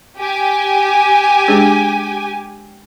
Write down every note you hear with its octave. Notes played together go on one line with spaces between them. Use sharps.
G4 G#5
G#3 D4 G#4